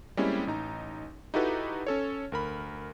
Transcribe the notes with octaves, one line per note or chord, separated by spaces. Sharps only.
G3 G#3 A#3 C4 C#4 E4
A1 D#4 A#5
D#4 E4 F#4 G4 A4 B4
C#4 A4 C#5
D2 A#4 B5